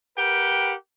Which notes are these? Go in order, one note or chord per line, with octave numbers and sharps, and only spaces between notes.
G4 A#4 B4 F#5 G5